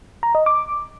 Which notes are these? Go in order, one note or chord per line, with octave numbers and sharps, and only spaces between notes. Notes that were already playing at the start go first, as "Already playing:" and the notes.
A#5
D#5
D6